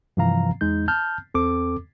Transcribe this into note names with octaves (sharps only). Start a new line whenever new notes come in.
G2 C3 E3 F3 F5 A#5
E2 G#3 D#4 G6
A5 F6 G6
E2 C4 A4 D6